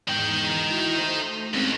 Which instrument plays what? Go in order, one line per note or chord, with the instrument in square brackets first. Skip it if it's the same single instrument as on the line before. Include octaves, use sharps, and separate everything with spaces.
[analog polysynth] E2 G#2 [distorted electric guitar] D#4 G5
[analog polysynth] E4 F#4
A3 C5
[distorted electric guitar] D#2 [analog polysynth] G#3 C4 C#4